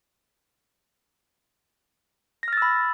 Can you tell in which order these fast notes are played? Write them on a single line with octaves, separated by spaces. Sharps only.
A#6 F6 A6 E6 B5